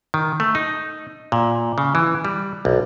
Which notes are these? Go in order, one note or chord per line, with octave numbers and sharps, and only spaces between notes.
D#3
A3
D#4
A#2
C#3
E3
G3
B1